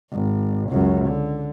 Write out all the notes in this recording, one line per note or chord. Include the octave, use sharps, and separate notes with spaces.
G#1
C#2 F#2
D3